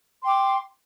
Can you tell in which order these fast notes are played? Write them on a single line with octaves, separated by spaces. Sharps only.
C6 G5 D6